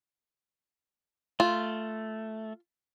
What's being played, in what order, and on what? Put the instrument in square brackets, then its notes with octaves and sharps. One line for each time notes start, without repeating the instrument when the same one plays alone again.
[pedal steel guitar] A3 [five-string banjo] F4